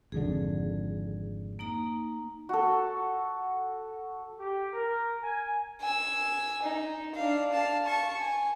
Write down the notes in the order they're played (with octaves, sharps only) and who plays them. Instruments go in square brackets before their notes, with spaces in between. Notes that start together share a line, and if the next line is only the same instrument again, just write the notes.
[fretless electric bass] G#1 F2 D3 [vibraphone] G#4
[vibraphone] A#3 D#4 A#5
[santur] F#4 A4
[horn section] G4
A#4
G#5
[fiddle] G#5 E6
D#4
D4 F5
F5 A5
A5 C#6
G#5